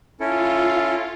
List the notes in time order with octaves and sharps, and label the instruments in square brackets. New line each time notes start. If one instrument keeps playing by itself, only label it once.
[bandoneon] C#4 E4 A4 [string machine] F4